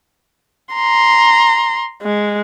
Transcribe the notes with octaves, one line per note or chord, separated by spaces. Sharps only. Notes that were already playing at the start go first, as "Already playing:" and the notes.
A#5 C6
G#3